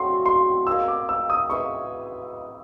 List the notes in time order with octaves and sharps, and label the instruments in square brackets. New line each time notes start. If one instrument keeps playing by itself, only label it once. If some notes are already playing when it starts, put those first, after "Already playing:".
Already playing: [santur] F#3 A3 C4 D4 F#4 [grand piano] C6
[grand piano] C6
[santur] A#3 D#4 G#4 [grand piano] E6
[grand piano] D6
E6
D#6
[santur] D#4 G#4 B4 E5 [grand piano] C#6